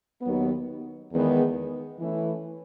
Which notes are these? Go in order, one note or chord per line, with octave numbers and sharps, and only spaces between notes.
D#2 D#3 F#3 B3
E2 D#3 G#3 B3
E3 A3 C#4 E4